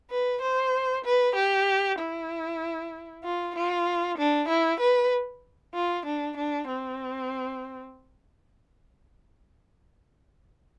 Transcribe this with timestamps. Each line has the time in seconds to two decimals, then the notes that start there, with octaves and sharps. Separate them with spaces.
0.11 B4
0.42 C5
1.05 B4
1.35 G4
1.99 E4
3.24 F4
3.56 F4
4.18 D4
4.49 E4
4.80 B4
5.74 F4
6.06 D4
6.37 D4
6.68 C4